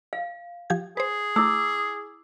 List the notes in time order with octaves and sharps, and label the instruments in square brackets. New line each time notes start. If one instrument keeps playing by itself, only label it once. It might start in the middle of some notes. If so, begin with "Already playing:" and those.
[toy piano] F5
[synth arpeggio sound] F3 G4 G#6
[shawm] G#4 [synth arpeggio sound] B4 C5
[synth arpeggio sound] A3 [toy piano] E4 D6 E6